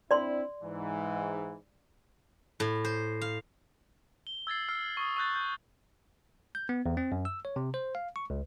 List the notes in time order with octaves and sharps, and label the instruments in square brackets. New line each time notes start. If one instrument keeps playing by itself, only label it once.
[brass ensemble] C4 D4 E4 [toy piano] D5 C6
[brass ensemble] G#2 E3
[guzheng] A2
C5
F5
[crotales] G7
E6 G#6 A6 C7
E6 F6 C7
C#6 D#6
C#6 E6 F#6 G6 A6
G6
[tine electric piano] G6
B3
E2
C4
F#2
E6
C#5
C3
C5
F5
C#6
C#2